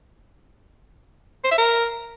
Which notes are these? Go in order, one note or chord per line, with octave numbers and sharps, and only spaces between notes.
C5
E5
A#4